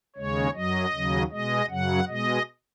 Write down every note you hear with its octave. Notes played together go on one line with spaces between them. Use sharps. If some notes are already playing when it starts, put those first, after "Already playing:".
D#2 C#3 G#3 C#5
F#2 F#3 D#5
D#2 C#3 F#3
B2 G#3 D#5
F#2 C#3 F#3 F#5
B2 G#3 D#5